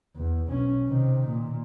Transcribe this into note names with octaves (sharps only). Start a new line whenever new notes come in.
E2
B1 C#4
C3 D#3
A#2